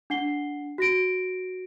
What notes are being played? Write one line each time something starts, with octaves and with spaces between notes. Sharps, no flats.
D4 F#5 C7 G7
F#4 A#6 D7